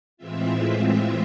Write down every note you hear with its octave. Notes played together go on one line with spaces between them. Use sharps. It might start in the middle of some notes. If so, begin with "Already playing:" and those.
A2 E3 G#3 C4 F4 E5